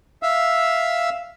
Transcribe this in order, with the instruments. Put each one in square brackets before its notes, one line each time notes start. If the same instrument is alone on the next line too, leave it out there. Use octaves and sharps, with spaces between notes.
[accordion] E5 F5 E6